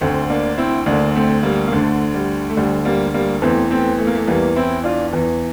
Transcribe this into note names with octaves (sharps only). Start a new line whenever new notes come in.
D2 D3 A3 C4
A#3 D4
C4 E4
D2 D3 A#3 D4
A3 C4
G3 A#3
A#3
D2 D3 A3
G3
A3
D2 D3 G3
G3 A#3
G3 A#3
E2 E3 A3 C4
A3 C4
A3
A#3
A3
E2 E3 G3 A#3
C4 E4
D4 F4
E2 E3